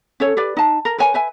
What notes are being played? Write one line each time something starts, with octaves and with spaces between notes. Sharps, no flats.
C#4 A4 C#5
G4 B4 D5
D#4 A5
A#4
A#4 B4 C#5 G#5
B4 E5 G#5